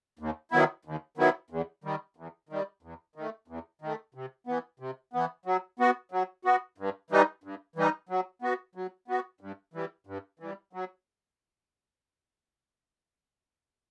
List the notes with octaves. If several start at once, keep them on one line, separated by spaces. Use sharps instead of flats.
D#2
D#3 F#3 B3 E4
D#2
D#3 F#3 B3 E4
E2
D#3 G3
E2
D#3 G3
E2
D#3 A3
E2
D#3 A3
C3
E3 B3
C3
E3 B3
F#3
B3 F#4
F#3
B3 F#4
G2
E3 G3 D#4
G2
E3 G3 D#4
F#3
B3 F#4
F#3
B3 F#4
G2
E3 G3
G2
E3 G3
F#3